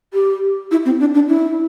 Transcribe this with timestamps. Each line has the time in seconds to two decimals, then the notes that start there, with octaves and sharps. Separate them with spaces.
0.13 G4
0.71 E4
0.85 C4
1.00 D4
1.14 D4
1.28 E4